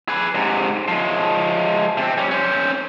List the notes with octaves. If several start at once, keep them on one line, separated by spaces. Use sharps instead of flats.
G#4 B4
G#2 C3
F3 G#3
C3 C4
G3 C#4
C#4 C5